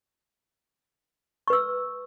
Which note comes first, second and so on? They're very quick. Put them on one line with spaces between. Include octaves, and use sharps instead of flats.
C#6 B4 E6